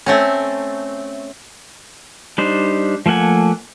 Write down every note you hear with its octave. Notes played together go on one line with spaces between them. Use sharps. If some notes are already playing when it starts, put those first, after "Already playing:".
A3 C4 C#4
G3 D4 D#4 C5
F3 A3 A#3 F#5 G#5